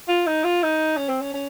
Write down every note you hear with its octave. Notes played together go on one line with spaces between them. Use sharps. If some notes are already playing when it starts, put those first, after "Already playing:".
F4
D#4
F4
D#4
C#4
C4
C#4
C#4